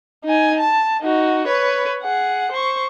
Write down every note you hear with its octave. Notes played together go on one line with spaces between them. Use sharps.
D#4 G#5
A5
D#4 F#4
B4 C#5
G#4 F#5
C5 C#6